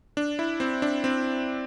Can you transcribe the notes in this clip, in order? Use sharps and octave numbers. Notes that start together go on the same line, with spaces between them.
D4
E4
C4
D4
C4